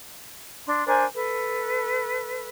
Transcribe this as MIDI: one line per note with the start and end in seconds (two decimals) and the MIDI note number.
0.67 0.85 62
0.67 0.85 84
0.86 1.04 62
0.86 1.04 70
0.86 1.04 72
0.86 1.04 80
1.14 2.49 69
1.14 2.49 71